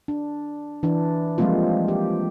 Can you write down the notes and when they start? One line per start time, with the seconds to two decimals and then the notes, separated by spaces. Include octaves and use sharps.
0.08 D4
0.83 E3 D4
1.38 F3 G3 G#3 A#3 C4 F4
1.88 G4